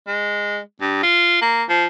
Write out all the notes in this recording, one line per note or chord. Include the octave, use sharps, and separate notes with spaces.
G#3
G2
F4
A#3
F3